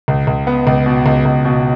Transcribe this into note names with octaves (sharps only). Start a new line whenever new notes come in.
C#2
C#2
B3
C#2
B2
C#2
C#2
B2